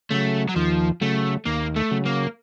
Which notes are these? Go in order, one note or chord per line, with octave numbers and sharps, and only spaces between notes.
C#3 F#3 A3
F#3
D#2 F3
C#3 F#3 A3
D#2 A#3
A3
C#3 F#3
A#3